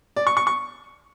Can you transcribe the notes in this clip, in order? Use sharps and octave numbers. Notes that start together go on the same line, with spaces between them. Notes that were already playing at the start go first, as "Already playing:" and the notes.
D5
C#6
C#6
C#6